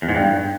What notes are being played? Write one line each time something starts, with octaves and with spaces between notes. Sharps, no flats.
E2
G#2
G2